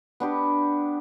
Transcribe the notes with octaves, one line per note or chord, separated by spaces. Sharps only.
B3 D4 G4